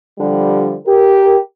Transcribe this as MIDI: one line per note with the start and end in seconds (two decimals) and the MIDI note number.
0.18 0.75 50
0.18 0.75 53
0.18 0.75 55
0.85 1.37 67
0.85 1.37 70